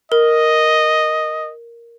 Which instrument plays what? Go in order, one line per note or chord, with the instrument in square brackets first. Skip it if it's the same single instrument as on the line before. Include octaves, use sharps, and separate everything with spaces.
[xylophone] A#4 [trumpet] D#5